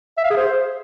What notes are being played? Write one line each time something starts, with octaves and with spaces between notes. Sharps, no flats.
E5
F5
G#4
C5